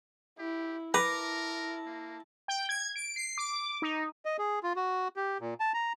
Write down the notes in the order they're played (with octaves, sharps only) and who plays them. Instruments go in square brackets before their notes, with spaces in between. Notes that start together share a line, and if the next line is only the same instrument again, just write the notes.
[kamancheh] E4 [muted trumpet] G4
[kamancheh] E4 A5 [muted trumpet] A#4 [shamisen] B4 [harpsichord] A#5 D6
[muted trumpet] A#3
[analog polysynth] G5
G#6
D7
C7
D6
D#4
[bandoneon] D#5
G#4
F4
F#4
G4
A#2
A5
A#5